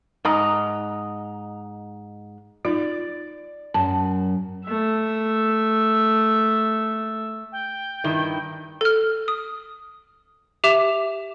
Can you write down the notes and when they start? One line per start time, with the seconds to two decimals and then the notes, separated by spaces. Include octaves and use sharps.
0.25 G#2 D#5 A#5
2.65 D#4 F4 D5
3.74 F#2 A5
4.65 A3 E5
7.52 G5
8.04 G2 D#3 E4
8.81 A4 F6
9.28 D#6
10.64 G4 E5 D6 E7